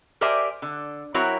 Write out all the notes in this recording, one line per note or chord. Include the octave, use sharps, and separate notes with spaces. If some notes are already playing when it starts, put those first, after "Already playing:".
G4 A#4 C5 D5 E5 G#5
D3
F#3 C4 E4 F#4 A#4 C#5